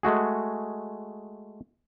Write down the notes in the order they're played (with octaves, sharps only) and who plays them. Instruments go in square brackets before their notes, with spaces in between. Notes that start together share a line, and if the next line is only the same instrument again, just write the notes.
[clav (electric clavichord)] G#3 A3 F#4 G#4